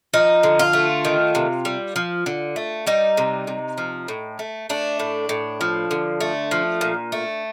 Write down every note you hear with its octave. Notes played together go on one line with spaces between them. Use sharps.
F3 D#4
D3
F4
A3
D#3
C3
G3
F3
D3
A3
G3 D#4
C3
C3
F3
A2
A3
A3 D4
A2
A2
F3
D3
A3
F3
A#2
A3